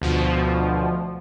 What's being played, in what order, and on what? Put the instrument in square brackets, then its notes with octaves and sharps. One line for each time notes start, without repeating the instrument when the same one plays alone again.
[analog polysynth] D2 B2 F3